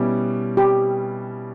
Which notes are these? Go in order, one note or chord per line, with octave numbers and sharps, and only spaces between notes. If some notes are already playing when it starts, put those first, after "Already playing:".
Already playing: B2 G3 C#4 E4
G4